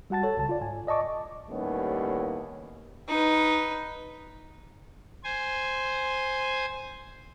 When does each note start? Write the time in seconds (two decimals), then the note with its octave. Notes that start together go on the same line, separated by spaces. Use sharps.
0.10 G3 F#4 F#5 A5 A6
0.23 A4 C#5 A5
0.37 C2 C#3 A5
0.49 F4 D5
0.61 G#2 G#5
0.87 D5 D#5 A5 C#6 D6
1.49 D#2 A2 G3 A#3 B3 C#4
3.08 D#4 B4
5.24 C5 G#5